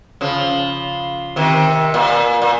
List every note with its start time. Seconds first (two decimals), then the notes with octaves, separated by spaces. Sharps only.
0.21 C#3 F3
1.36 C3 D#3
1.94 A#2
2.42 A#2